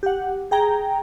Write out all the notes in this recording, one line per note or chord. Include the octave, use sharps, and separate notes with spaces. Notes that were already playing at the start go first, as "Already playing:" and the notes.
G4 F#5
G#4 G5 A#5